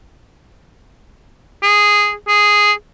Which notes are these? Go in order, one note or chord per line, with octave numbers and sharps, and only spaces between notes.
G#4
G#4